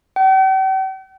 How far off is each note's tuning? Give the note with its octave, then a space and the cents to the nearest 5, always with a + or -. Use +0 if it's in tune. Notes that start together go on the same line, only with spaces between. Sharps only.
G5 -45